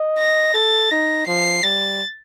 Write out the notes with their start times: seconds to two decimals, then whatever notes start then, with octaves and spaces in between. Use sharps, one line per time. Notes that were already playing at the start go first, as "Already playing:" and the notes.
Already playing: D#5
0.18 A#6
0.54 A4 A6
0.91 D#4 A#6
1.27 F3 C7
1.63 G3 A6